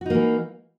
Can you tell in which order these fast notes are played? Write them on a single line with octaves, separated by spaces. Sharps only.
F#4 D#4 A#3 E3